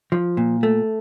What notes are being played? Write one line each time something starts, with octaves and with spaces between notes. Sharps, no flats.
F3
A#2
A3